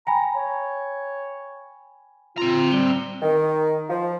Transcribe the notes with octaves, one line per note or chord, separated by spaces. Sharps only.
G5 G#5 A#5 B5
C#5
C4 F4 A#5
G3 G7
D#3
F3